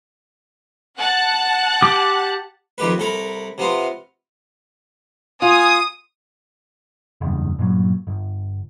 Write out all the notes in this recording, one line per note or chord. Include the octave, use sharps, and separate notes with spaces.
F#5 A5 F#6
G4 D6
F2 D#3 G4 B4
C2 A4 A#4 B5
C3 B3 F4
F4 G#5 D#6
F#1 E2 G2
G2 A#2 C#3 F#3
G1